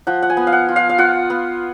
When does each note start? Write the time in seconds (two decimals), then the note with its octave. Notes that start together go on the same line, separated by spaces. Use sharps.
0.07 F3 F#5
0.22 F#5
0.30 G#5
0.37 B3
0.47 F5
0.52 F#5
0.69 F4
0.76 F5
0.89 F5
0.98 F4 F#5
1.30 B3